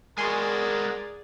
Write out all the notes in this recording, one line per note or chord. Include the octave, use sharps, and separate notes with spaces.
G#3 F#4 G#4 A#4 D5 G#5 C6